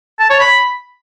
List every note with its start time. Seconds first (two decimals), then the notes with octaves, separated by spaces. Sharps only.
0.20 A5
0.30 C#5
0.40 B5